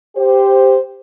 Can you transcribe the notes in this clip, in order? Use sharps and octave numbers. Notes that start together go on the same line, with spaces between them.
G4 C5